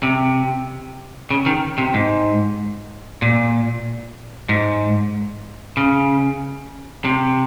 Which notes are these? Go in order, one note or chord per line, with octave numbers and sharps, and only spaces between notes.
C3
C#3
D#3
C3
G#2
A#2
G#2
C#3
C3